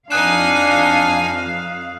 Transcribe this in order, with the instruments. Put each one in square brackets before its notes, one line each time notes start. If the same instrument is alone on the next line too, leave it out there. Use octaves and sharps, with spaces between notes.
[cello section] F2 F5 [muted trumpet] D4 [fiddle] D#4 G#5 [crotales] D#6 F#6 E7